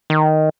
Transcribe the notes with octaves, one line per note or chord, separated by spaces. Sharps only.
D#3